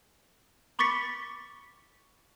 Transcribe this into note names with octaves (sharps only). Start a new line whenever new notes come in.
B5 C#6 D6 A6 B6 C#7